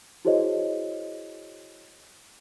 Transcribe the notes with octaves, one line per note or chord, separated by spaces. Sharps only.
E4 F#4 G#4 C5 C#5 D#5